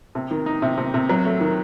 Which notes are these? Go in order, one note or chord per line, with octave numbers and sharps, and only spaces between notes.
C3
D#3
D#4
C3
C3
C3
F#3
A3
D#3